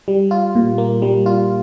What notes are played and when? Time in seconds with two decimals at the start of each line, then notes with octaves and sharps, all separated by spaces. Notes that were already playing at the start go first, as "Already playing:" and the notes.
0.08 G3
0.31 F4
0.55 A#2
0.78 A#3
1.02 G3
1.26 F4